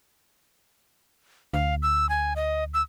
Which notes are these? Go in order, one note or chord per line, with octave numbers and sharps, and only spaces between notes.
D2 F5
E6
G#5
D#5
E6